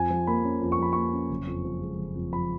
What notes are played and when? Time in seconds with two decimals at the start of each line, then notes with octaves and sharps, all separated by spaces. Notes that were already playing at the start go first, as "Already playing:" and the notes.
Already playing: F2 G#5
0.10 F3
0.27 A#3 B5
0.44 C#4
0.62 F2
0.72 C#6
0.79 F3 B5
0.93 A#3 C#6
1.13 C#4
1.29 F#1
1.47 F2
1.65 F3
1.82 G#3
1.99 F#1
2.15 F2
2.32 F3 B5